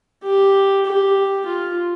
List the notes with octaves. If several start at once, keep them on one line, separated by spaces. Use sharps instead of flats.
G4
G4
F4